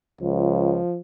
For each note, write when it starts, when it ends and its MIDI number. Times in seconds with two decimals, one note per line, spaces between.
0.21 0.79 37
0.21 0.99 53